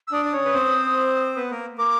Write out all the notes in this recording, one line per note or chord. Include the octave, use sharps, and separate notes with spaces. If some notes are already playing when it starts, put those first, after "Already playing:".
E6
D4 D5 D#6
D5
C#4 C#5
B4
C4 C5
B3 B4
A#3 A#4
A#3 A#4 D6